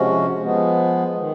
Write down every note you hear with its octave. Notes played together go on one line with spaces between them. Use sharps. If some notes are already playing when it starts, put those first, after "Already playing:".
Already playing: C3 F3 G#3 C#4 F#4
F3 G#3 B3
D#3